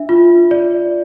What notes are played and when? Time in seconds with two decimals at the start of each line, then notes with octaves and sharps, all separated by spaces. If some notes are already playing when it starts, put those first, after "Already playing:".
Already playing: D4 E5
0.09 F4
0.51 D5